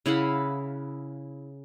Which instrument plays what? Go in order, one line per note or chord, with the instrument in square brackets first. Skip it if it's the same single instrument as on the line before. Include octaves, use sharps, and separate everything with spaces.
[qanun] C#3 E4 F5 F#5